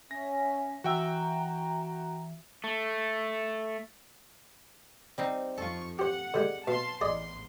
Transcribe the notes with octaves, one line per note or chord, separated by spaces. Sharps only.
C#4 E5 G#5 A#6
E3 F#4 E5 G5 A#5
A3
G3 C4 D#4
F2 F3 F4 A4 C#6
G4 C5 F#5
D3 G3 G#3
B2 F5 A5 C6
A1 E2 G#4 D5 D#5 C6